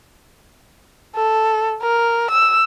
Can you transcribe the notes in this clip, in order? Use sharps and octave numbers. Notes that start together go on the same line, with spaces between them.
A4
A#4
E6